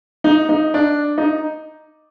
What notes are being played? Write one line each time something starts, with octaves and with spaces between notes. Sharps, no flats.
D#4
D#4
D4
D#4